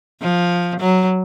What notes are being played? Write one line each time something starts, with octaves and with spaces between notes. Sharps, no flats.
F3
F#3